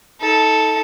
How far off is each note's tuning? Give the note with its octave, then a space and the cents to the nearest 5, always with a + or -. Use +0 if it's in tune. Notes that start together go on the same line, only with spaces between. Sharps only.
D#4 +40 A4 +0